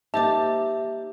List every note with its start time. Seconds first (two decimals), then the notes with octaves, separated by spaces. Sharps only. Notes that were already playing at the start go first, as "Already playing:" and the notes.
0.14 A#3 D#4 G4 C5 E5 A5 D6